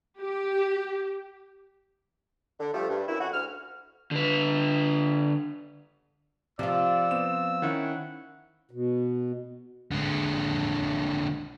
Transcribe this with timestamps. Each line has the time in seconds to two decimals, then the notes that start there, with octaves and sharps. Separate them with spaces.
0.20 G4
2.59 D3
2.73 F3 G3 A3
2.88 G2
3.07 F#2 E4
3.20 F2 A3 C#4 F#4
3.33 D2 F6
4.11 D3 B4
6.59 C3 F3 F4 D5 E6
7.11 B3 C4 E7
7.62 D#3 C#4 E4 F#5
8.71 B2
9.91 D3 G#3